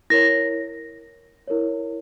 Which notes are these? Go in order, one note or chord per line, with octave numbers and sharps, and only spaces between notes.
E4 A#4 C#5 A#6
E4 A#4 C#5